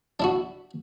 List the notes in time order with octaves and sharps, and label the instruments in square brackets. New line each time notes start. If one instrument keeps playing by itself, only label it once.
[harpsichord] D4 E4 F#4